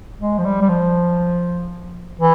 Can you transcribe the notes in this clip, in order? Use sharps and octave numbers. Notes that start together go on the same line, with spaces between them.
G#3
F3
G3
G3
F3
E3